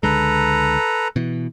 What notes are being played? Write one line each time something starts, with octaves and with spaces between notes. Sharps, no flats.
C#2 D3 G#3 A4 B4 A#5
B2 E3